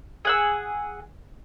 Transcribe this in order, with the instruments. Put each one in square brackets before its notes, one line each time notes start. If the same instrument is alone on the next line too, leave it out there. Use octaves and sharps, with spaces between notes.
[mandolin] G#4 F#5 E6